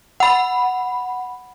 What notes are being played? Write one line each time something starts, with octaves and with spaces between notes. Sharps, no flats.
F#5 B5